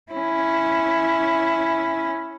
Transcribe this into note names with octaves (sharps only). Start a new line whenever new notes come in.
C#4 E4